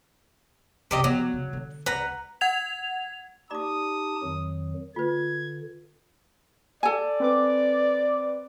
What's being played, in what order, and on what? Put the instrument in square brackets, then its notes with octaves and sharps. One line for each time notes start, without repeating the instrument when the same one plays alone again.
[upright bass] C2 F#2 [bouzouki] C3 G4 D#5
[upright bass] F3 B3 [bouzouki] F#3
[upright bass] C#3
D3
[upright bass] C#2 [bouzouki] B4 F#5 A#5
[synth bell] F#5 G#6 F7
[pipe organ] D#4 G4 A5 [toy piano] D5 D6 [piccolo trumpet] D#6
[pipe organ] F2 D#3 F#3
[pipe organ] D3 [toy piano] F4 B4 [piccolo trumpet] G#6
[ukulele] A4 G#5 [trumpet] D5
[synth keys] C4 B4 D6